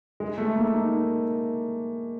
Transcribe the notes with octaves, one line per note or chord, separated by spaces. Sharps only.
G#3
A3
A#3
D#4